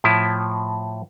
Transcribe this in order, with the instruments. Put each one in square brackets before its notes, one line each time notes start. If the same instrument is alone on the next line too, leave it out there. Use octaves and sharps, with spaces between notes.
[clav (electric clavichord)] A2 F3 E4